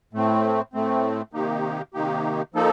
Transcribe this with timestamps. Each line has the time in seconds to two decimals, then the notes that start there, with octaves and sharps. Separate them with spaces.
0.13 A2 A3 C4
0.73 A2 A3 C4
1.33 C3 D#3 A#3 D#4 G4
1.94 C3 D#3 A#3 D#4 G4
2.54 F3 A#3 D#4 A4